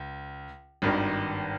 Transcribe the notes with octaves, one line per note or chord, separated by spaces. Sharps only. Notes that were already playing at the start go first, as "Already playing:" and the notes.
Already playing: C#2
G#1 G2 D#3